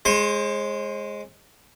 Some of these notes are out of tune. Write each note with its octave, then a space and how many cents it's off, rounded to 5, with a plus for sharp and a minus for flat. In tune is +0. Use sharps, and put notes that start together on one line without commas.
G#3 +0 C5 +40